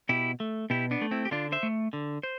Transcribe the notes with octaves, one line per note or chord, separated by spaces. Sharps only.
B2 E4 G4
A3
B2 E4 G4
B3 D4
A3
C4 E4
G4
D3 D4 F4
C5 E5
A3
D3
C5